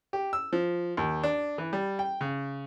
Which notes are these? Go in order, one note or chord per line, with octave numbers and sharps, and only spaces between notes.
G4
E6
F3
D#2
D4
E3
G3
G5
C#3